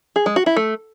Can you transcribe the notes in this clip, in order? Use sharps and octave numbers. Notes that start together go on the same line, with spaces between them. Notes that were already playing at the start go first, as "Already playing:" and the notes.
G#4
G#3
F#4
E4
A3